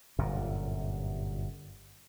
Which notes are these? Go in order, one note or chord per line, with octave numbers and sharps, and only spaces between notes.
G1 F#2 A#2